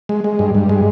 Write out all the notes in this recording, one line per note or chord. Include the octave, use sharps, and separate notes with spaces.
G#3
G#3
G2
G2
G#3